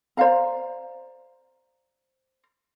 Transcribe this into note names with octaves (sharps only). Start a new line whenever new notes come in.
C5 D5 F5 A#5